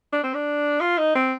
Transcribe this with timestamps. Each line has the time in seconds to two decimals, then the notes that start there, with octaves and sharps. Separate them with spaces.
0.13 D4
0.23 C4
0.34 D4
0.80 F4
0.98 D#4
1.15 C4